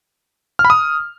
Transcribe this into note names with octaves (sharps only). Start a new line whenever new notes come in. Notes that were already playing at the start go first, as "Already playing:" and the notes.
F6
B5
D#6